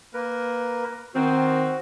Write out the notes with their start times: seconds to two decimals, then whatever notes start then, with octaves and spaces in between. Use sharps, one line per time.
0.14 A#3 A#4 B4
1.14 D#3 C4 F#4